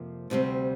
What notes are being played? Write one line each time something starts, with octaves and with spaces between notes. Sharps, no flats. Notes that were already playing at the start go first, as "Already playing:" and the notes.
Already playing: F2 C3 F3 A#3
D2 C3 G3 C4